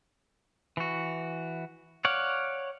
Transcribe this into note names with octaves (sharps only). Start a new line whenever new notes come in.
E3 F#4
C#5 D5 F5 F#5